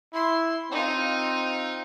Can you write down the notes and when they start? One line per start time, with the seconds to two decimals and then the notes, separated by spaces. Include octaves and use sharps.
0.14 E4 C6
0.71 C4 D#4 F4